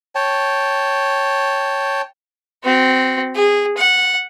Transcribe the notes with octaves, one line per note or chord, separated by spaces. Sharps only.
C#5 G5 A5
C4 F#4
G#4
F#5